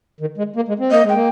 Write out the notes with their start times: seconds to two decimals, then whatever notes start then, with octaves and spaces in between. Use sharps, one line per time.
0.20 D#3
0.38 G#3
0.56 A#3
0.68 G#3
0.79 C4
0.91 A#3 D#5
1.03 G#3
1.09 A#3 G5